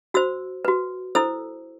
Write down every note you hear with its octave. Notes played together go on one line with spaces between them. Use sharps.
F#4 C5 E6
F#4 B4
E4 A4 C5 E6